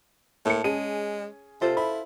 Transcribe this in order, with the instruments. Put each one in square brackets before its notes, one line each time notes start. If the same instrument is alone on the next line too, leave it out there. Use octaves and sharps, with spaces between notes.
[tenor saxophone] A2 [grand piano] A#3 C#7 [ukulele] A5
[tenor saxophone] G#3 [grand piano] C#4 G#4 D#7
[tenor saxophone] C3 [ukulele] F4 A4 C5
[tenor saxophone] E4 [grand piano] B5